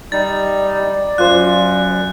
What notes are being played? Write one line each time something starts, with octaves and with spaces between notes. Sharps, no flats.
G3 D#4 D5 A6
F#2 F4 C5 F#6